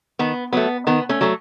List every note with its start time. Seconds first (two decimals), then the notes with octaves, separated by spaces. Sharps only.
0.19 D#3 B3
0.53 F#3 A3 B3
0.87 D#3 B3
1.09 A3 C#4
1.21 F#3 A3